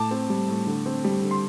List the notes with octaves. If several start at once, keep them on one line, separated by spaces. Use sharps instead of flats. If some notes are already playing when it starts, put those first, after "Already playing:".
Already playing: A2 A5 D6
C4
G3
A2
D3
C4
G3
D3
C6